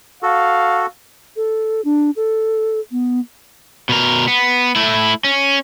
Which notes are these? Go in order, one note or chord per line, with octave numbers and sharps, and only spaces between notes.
F#4 A4 F5
A4
D4
A4
B3
B2 A#4
B3
A3 E4
C#4